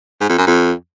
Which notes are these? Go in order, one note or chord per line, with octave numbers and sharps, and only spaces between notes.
G#2
F2
F#2
F2